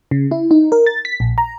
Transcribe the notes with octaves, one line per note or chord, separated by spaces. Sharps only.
C#3
E4
D#4
A#4
A6
B6
A#1
A#5